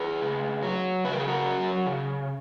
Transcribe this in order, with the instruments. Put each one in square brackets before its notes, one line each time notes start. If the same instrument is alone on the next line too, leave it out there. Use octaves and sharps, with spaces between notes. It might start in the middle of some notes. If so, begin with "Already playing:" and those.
Already playing: [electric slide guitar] G#4 B4
C#3
F#3
C#3 B4
A#4
G#4
F#4 A#4
F#3
C#3